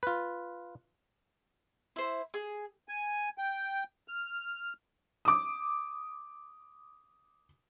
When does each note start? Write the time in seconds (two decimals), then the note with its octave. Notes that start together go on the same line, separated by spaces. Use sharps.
0.03 F4 B4
1.96 E4 C5
2.34 G#4
2.89 G#5
3.38 G5
4.08 F6
5.25 D6 D#6